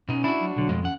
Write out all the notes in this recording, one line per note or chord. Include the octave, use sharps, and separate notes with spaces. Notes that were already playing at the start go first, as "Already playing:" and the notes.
B2 C#4 D#4
D4 E4 F#4
F#3
B1 D3 F#3
F2 B2 G#3
D#2 C#4 F#5